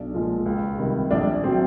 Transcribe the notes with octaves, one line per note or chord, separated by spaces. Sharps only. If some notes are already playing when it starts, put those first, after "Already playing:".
Already playing: B1 D4
A#2 F3 G#3
C#2
C3 D#3 G3
A#1 D4
A2 F#3 C4